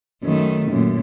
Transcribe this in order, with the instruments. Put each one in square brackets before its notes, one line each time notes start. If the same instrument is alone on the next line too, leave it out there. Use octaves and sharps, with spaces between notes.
[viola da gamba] F#2 D#3 A3
F#2 A#2